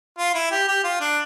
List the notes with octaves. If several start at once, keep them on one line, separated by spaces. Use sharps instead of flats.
F4
E4
G4
G4
F4
D4